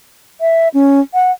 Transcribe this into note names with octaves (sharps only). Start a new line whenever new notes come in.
E5
C#4
F#5